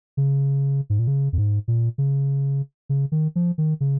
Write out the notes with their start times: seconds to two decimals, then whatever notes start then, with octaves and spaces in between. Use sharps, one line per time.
0.17 C#3
0.90 G#2
0.99 A#2
1.07 C#3
1.33 F2
1.38 G#2
1.68 A#2
1.98 C#3
2.89 C#3
3.12 D#3
3.36 F3
3.58 D#3
3.81 C#3